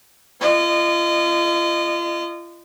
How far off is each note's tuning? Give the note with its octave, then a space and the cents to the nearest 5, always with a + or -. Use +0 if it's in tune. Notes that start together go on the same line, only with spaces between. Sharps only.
F4 -35 D#5 -30